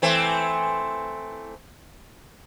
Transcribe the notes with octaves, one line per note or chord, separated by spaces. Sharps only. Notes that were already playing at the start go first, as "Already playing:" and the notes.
E3 A3 C4